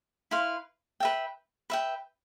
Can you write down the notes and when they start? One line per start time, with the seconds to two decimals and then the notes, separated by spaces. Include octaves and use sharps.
0.31 E4 B4 F5 C6
1.00 B4 E5 G5
1.70 B4 E5 G5